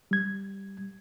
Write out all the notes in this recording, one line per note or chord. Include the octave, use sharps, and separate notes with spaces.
G3 G#6